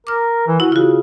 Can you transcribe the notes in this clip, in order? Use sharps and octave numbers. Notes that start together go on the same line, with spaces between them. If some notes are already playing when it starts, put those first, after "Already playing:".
A#4 D6 F6
E3
E4 F#4
C#3 F4 F#4